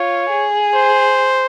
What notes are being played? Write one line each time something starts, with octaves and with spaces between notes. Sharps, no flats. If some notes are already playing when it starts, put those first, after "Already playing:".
Already playing: F4 C#5
G#4
C5